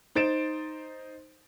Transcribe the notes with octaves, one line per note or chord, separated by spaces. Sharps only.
D#4 C5 A6 D7 E7